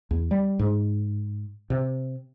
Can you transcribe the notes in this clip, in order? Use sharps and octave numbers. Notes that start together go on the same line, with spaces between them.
E2
G3
G#2
C3